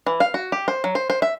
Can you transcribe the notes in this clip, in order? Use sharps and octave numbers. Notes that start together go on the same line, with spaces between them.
E3
F5
F#4
G4
C5
F#3
C5
C5
E5